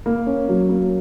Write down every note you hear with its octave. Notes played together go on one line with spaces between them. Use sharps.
A#3
C#4
F#3
A#3